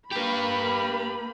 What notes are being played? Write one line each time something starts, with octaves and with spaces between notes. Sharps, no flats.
A#3 G4 B4 B5